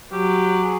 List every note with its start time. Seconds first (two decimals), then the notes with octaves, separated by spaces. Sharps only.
0.12 F#3 G4
0.63 G#4